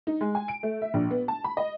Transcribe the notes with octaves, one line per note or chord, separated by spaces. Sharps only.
D#4
G#3
G#5
D7
A3
E5
A#1
B3
A5
B5
D#5